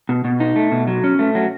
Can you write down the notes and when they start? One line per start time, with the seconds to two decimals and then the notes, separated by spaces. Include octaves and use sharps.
0.09 B2
0.24 B2
0.40 D#4
0.56 A3
0.72 B2
0.87 F#3
1.04 C#4
1.19 A3
1.35 F#3